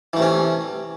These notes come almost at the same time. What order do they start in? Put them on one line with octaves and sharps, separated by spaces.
E3 A3 C3 C#4